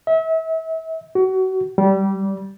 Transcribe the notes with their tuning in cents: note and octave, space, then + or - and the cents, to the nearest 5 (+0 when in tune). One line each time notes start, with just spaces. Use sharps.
E5 -35
F#4 +30
G3 -20